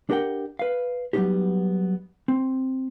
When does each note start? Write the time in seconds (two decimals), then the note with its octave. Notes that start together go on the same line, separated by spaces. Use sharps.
0.10 D4 G4 A#4 F#5 G5
0.59 B4 F5
1.13 F#3 G3 B3 C4 D#4 G4
2.28 C4